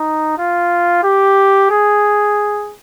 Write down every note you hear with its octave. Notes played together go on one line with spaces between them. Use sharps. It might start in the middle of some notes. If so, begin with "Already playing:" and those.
Already playing: D#4
F4
G4
G#4